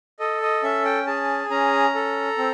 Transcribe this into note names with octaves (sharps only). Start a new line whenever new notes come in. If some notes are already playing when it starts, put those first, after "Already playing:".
A4 D#5
D#5
C#4 E5
G5
G#4 A5
C#4 A#5
A4
C4